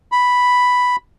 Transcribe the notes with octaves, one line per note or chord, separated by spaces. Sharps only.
B5